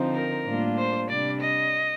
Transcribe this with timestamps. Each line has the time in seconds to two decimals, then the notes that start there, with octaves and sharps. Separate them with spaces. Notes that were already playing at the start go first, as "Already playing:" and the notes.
Already playing: D3 F3 C4 D#4
0.15 A#4
0.47 A2 G3 A#3 D4 F4
0.78 C5
1.08 C3 G3 D4 D5
1.40 D#5